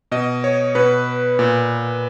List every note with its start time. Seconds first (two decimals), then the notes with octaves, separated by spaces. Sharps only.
0.12 B2 D#5
0.44 C#5
0.75 B2 B4
1.39 A#2